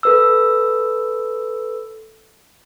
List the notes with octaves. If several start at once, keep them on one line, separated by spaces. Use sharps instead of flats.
A4 B4 E6